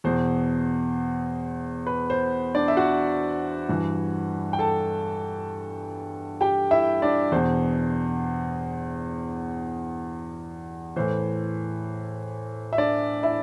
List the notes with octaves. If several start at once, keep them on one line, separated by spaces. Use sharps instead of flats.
E2 B2 C5
B4
C5
D4 D5
E5
F#4 F#5
G2 E3
G5
A4 A5
G4 G5
E4 E5
D4 D5
E2 B2 C5
A2 E3 C5
E5
D4 D5
E4 E5